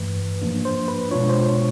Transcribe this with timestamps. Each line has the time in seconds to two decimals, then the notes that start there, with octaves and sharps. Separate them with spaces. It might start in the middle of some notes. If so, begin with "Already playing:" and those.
Already playing: G2 E3 A3 B4
0.42 G#2 F3 A#3 D4
0.65 C5
0.88 B4
1.11 B2 G#3 B3 D4 F4 C#5
1.29 C5
1.46 C#5